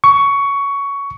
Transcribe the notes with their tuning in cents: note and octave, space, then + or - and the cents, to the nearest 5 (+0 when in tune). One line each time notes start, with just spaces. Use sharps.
C#6 +15